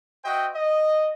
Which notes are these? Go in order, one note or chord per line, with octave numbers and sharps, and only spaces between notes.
F#4 C5 D#5 E5 G5
D#5